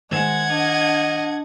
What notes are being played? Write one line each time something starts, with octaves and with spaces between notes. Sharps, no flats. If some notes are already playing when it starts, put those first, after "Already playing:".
D#3 G#3 C5 F#5 G#6 E7
D4 D#5 A5